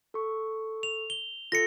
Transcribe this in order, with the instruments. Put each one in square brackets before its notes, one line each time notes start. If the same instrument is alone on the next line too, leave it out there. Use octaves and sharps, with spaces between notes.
[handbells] A4 C#6
[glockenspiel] F7
G7
[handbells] F4 A4 [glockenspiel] A#6 C#7